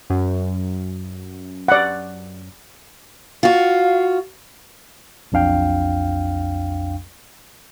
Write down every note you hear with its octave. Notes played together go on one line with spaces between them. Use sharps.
F#2
D5 F#5
F4 F#4 F5
B1 F2 D4 F5 G5